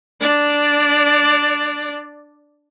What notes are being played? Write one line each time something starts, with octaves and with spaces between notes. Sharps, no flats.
D4 D5